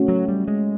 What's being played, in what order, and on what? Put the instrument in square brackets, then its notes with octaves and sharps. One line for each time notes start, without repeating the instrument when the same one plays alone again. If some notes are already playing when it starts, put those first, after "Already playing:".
Already playing: [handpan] A3 C#4 F#4
[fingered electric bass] F#3
G3
G#3